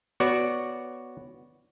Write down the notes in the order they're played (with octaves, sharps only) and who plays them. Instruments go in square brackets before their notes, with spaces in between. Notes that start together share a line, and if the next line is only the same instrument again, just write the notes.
[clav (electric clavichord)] B3 F#4 C#5 D5